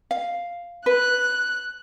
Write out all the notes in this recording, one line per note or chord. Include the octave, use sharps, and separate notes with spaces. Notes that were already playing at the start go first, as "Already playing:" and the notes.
F5
B4 F#6